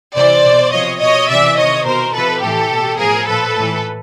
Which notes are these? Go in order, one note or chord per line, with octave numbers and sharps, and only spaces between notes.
C3 E3 C5 D5
B2
C3 F3 C#5 D#5
B2 C#5 D#5
C3 E3 D5 E5
C3 D#3 C#5 D#5
B2 A#4 C5
C3 F3 A4 B4
A2 E3 G4 A4
B2
A2 F3 G#4 A#4
A#2 F3 A4 B4
A2 E3